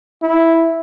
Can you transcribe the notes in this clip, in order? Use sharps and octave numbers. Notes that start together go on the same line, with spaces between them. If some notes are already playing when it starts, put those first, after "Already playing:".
E4